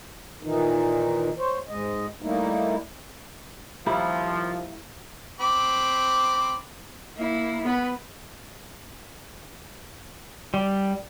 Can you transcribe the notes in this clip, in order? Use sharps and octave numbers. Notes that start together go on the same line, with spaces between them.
A#2 D#3 E3 D#4
C5 C#5
G#2 G#3 D#5
G3 A3 A#3 D#4 E4
D#2 F3 G3 A#3 E4
C4 B5 D6
A#3 E4
B3 B4
G3